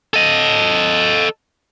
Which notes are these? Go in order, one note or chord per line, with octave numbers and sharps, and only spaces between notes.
A4 D#5